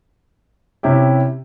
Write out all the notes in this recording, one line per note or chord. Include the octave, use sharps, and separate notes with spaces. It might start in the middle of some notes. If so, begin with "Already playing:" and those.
C3 C#4 E4 G4